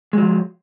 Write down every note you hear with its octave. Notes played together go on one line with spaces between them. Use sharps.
F3 F#3 G#3